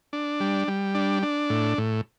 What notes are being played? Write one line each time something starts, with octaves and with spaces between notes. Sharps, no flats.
D4
G3
G3
D4
D4
A2
A2